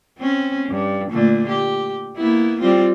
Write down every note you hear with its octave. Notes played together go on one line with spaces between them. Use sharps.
C4 C#4
G2
A#2 D3 A3
G4
A#3 B3 E4
G3 C4 F4